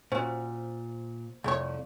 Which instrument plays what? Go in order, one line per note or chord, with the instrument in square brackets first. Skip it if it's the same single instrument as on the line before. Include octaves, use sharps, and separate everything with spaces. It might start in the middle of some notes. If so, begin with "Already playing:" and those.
[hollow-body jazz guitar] A#2 [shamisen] C#4 F#4 [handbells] C5
[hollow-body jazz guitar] C2 F2 [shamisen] A3 C#5